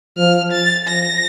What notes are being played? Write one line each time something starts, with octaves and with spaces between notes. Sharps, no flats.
F3 F6
A6
F3 A#6